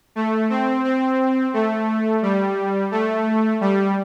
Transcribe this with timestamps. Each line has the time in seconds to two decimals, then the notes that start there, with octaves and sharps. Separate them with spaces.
0.16 A3
0.50 C4
0.84 C4
1.54 A3
2.22 G3
2.91 A3
3.61 G3